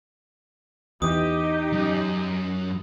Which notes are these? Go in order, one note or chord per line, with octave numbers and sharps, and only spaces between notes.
E2 E3 D#4 G4 D#5 D#6
F#2